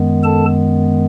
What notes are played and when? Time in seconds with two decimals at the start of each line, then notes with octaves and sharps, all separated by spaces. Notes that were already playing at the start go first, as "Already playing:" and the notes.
Already playing: F#2 D#3 G#3 B3
0.24 A4 A5